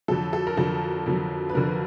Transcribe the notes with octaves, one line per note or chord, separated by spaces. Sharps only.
F2 D3 F#3 A4
A4
A#4
F2 D3 F#3 A4
F2 D3 F#3
B4
F2 D3 F#3 A#4